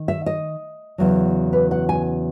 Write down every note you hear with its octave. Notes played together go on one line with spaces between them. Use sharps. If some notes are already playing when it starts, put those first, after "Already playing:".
Already playing: D#3
E5
D#5
E2 C#3 F#3
B4
F#5
G#5